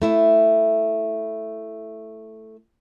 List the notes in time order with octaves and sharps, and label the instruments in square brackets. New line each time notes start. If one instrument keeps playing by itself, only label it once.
[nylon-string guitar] A3 E4 E5